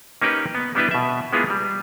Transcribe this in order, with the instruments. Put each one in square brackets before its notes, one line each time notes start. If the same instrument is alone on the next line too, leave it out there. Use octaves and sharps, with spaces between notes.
[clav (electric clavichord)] A#3 C#4 D#4 G4 B4
B3
G3 B3 D4 E4 G4 B4
B2 E5
G#3 A#3 B3 E4 F4 G#4
G3